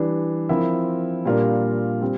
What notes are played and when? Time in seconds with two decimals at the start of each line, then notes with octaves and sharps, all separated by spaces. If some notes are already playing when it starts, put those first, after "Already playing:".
Already playing: E3 G3 D4
0.49 F3 C4 E4 A#4 E5
1.25 A#2 G3 D4 F4 A#4
2.01 G3 C4